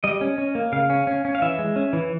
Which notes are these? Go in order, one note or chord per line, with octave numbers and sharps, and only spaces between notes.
G3 D#5
C#4
C#4
A#3
C#3 F5
C#4
C#4
C#4
F5
E3 E5
G#3
C#4
E3